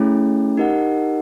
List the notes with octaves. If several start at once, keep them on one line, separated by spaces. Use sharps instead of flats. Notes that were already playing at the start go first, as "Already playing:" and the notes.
Already playing: A3 C#4 E4 G#4
D#4 G4 A#4 D#5 F#5